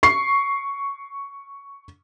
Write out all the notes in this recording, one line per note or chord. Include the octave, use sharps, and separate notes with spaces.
C#6 C7